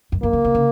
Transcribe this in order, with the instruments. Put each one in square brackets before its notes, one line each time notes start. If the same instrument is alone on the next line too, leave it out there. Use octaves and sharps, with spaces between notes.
[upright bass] F#2
[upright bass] F#2 [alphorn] A#3
[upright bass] C#3
C3
C#3